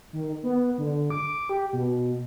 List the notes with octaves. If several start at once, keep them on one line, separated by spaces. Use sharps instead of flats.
D#3
B3
D3
D6
G4
B2